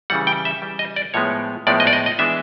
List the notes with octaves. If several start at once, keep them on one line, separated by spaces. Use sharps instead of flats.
C#3 E3 G3 F#5
G5
E5
C#3 E3 G3
D#5
D5
A2 F3 G#3 B3 C#5
A2 F3 G#3 B3 D5
D#5
D5
D#5
D#5
E3 G#3 B3 D4 E5